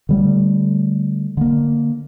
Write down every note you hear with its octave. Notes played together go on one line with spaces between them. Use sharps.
D3 G3 A3
D3 A#3